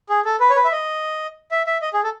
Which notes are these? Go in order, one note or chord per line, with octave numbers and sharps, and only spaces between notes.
G#4
A4
B4
C#5
B4
E5
D#5
E5
E5
D#5
G#4
A4